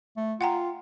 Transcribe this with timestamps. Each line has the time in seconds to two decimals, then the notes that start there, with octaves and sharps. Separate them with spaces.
0.17 A3
0.41 F4 F#5 G5 A#5